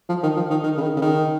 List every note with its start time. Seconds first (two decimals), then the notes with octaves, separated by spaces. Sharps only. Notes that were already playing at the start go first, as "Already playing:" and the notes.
0.09 F3
0.23 D#3
0.37 F3
0.50 D#3
0.64 D#3
0.77 C#3
0.82 D#3
0.96 C#3
1.02 D#3